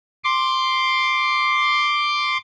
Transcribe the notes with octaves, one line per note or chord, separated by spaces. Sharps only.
C6 D6